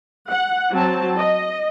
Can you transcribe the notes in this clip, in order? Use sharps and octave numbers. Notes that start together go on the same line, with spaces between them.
F#5
F#3 C4 A5
D#5